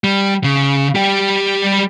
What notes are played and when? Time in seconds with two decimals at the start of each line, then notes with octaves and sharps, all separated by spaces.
0.04 G3
0.44 C#3
0.95 G3 G4